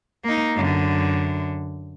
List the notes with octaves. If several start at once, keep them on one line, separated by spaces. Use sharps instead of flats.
A#3 D#4
F#2 D3